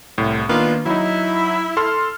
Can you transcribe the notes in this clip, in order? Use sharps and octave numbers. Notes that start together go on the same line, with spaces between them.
C2 A2
D#3 A#3 B3 D4 F4
F#3 D#4 E4
A4 C6 F6